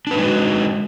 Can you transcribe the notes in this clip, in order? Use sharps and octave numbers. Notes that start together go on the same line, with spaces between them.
G#3 D4 D#4 F#4 B4